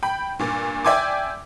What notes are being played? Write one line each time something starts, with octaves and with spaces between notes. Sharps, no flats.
G5 B5
G2 A#2
D5 E5 G5 G#5 C6 D6